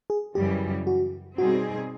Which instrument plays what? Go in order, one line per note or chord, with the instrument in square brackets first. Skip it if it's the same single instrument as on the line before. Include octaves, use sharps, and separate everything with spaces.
[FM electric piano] G#4
[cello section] F#2 C#3 E3 G3 [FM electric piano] G4
[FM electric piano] F#4
[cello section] B2 G3 C4 D#4 G#4 [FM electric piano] F#4